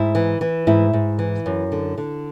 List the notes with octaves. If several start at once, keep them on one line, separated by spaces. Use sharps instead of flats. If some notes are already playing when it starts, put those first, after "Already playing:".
Already playing: G#2 E4
E3
E3
G#2 E4
G#2
E3
F#2
D3
D3